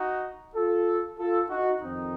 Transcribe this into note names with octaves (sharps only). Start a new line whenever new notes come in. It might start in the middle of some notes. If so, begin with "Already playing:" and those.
Already playing: D#4 F#4
F4 A4
F4 A4
D#4 F#4
F2 D#3 C4 D#4